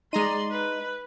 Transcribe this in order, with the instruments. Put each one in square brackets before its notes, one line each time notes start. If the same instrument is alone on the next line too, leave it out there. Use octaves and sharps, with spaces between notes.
[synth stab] G#3 A#5 D#7 [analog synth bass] D#4 [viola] D5 C6
[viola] B4